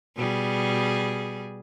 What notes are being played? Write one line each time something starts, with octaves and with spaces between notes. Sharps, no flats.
B2 G3 G#4